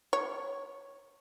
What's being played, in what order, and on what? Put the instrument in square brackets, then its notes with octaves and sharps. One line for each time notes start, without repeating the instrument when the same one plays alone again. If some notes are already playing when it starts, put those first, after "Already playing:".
[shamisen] C#5